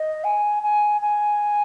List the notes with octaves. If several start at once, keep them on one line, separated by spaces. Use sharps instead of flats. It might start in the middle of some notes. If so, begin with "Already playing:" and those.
Already playing: D#5
G#5
G#5
G#5